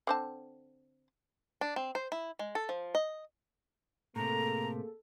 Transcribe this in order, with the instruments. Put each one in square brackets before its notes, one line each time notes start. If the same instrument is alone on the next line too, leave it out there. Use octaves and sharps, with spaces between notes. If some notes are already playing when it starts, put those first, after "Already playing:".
[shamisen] D3 C4 A5
[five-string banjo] D4
C4
C5
E4
G#3
A4
F3
D#5
[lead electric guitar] A2 C3 [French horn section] A#3 G#4 [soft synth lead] A4 [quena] A#5